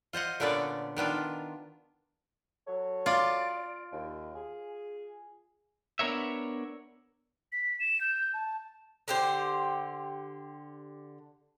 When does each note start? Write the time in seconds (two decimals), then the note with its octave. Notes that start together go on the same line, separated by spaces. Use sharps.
0.13 F4 C5 D#5 F#5
0.40 A#2 D3 B3 C#4 D5
0.97 D#3 B3 D4 F4
2.67 F#3 A4 C#5
3.06 F4 D5
3.92 D#2
4.36 G#4
5.99 B3 D4 A#4 C#5 E5
7.52 B6
7.80 E7
8.01 G6
8.34 A5
9.08 D3 G4 C5